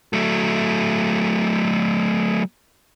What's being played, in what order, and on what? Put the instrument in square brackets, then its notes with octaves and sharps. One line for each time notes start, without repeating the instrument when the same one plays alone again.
[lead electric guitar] F#3 A3